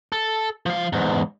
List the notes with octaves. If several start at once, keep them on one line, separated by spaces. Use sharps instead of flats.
A4
F3 F5
E2 G#2